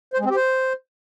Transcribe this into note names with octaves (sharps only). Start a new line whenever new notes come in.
C5
G#3
C4
G4
C5